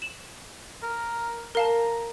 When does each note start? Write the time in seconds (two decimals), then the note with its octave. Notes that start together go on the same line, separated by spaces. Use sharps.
0.02 E7 F#7
0.82 A#4
1.55 A#4 F5 A5 A#5